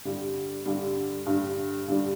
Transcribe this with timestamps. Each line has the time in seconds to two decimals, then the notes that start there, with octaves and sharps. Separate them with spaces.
0.05 G2 D3 G3
0.66 G2 D3 G3
1.26 G2 D3 G3
1.88 G2 D3 G3